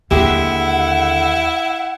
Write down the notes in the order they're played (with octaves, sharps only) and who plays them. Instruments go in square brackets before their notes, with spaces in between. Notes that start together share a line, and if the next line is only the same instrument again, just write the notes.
[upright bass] D#2 [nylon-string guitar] D3 G#3 G4 [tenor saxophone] E4 [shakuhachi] F#5